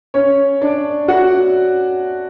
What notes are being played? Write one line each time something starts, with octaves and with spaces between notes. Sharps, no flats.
C#4 C#5
D4 D5
F#4 F#5